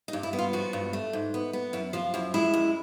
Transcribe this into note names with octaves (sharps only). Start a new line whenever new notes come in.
D#4
G2
E4
B3
F4
F3 F#4
G2
A3
G#2
B3
B3
F#2 E4
F3 F4
F#2 E4
G#3 E4
F#2